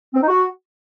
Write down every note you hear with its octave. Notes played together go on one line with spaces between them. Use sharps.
C4
D#4
F#4